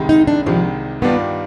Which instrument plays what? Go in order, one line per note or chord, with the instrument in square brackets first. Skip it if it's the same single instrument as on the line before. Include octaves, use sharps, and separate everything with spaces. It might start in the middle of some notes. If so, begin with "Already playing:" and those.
Already playing: [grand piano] C2 C3 D#3 G#3
[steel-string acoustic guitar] D#4
D4
[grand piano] C2 C3 D#3 G#3 [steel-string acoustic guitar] F3
[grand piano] G2 D#3 G3 D4 F4 [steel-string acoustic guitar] B3